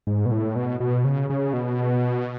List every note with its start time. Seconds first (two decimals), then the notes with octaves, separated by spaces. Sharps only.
0.07 G#2
0.26 B2
0.31 A2
0.56 B2
0.80 B2
1.04 C#3
1.30 C#3
1.53 B2